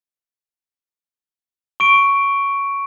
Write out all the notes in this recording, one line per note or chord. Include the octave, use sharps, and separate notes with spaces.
C#6 D7